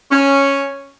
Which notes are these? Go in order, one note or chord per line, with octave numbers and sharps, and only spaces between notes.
C#4